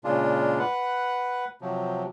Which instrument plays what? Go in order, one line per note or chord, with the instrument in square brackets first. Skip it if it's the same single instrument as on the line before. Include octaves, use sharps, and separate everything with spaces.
[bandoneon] A#2 C#3 G#3 D4 F4
B4 F#5
C3 F3 F#3